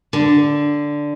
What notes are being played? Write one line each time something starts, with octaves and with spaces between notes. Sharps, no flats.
D3